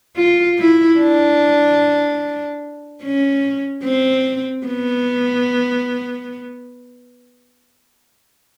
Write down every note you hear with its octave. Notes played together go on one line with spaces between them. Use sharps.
F4
E4
D4
C#4
C4
B3